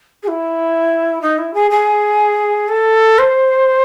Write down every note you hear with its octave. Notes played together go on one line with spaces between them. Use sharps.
G#4
E4
D#4
E4
G#4
G#4
A4
C5